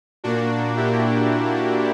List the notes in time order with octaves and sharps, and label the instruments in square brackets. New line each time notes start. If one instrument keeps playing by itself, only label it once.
[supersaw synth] A#2 A#3 D4 F#4
E4 G4